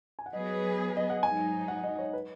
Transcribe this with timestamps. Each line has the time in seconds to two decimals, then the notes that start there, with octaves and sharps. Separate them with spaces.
0.19 G#5
0.26 F#5
0.32 F#3 B3 G#4 B4 D#5
0.97 D#5
1.10 F#5
1.23 G#2 F#3 D#4 G#5
1.68 F#5
1.84 D#5
1.98 C#5
2.13 B4